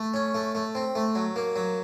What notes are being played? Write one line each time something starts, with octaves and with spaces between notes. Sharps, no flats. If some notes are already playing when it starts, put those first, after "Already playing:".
Already playing: A3
C#4
A3
A3
C4
A3
F#3
A#3
F#3